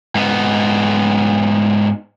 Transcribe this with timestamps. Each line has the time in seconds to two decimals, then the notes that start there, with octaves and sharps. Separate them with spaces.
0.15 G#2 B3